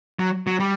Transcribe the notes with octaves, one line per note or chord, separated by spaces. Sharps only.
F#3
F#3
G3